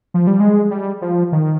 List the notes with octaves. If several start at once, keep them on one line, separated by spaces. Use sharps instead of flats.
F3
G3
G#3
G3
F3
D#3